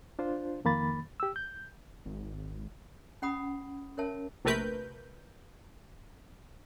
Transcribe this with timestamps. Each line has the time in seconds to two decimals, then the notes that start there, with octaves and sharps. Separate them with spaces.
0.19 D4 F4 C5
0.65 F2 D#3 A#3 B5 A6
1.20 G4 E6
1.36 G6
2.06 G#1
3.22 C#4 F#5 B5 D#6
3.97 C#4 A#4 C#5 E5 A5
4.45 A#1 C3 A3 A#4 B4 G6